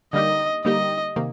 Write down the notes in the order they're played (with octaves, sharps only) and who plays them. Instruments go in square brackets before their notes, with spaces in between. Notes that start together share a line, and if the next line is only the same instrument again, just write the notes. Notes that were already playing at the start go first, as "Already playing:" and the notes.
[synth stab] D3 G3 A#3 D#4 G4 [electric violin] D#5
[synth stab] D3 G3 A#3 D#4 G4 [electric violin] D#5
[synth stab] C3 D#3 A#3